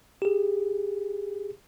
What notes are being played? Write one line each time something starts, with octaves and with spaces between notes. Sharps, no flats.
G4 G#4